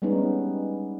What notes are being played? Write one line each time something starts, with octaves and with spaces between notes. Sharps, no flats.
G3 G#3 B3 C#4 D#4